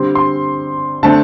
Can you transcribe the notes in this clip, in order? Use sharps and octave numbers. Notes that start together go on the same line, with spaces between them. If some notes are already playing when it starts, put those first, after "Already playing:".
Already playing: D3 G3 C4 C6
C6
D3 A3 C4 A5